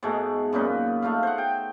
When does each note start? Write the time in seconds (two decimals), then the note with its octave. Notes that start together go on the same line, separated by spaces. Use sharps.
0.03 G#2 B2 G#3 A3
0.53 F#2 A#2 D#4 B4
1.02 A3 D#4 F4 F5
1.23 C5 F#5
1.38 G5